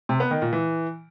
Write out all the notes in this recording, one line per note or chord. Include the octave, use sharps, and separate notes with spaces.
C3
B3
D#3
A#2
E3